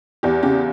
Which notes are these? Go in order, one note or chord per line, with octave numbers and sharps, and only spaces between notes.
E2 G4
C#3 G4